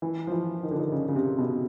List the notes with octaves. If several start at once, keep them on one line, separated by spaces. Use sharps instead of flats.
E3
F3
E3
D#3
D3
D#3
C#3
C#3
C3
B2